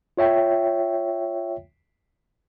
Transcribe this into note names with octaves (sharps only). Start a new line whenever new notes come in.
F4 C#5 E5 G5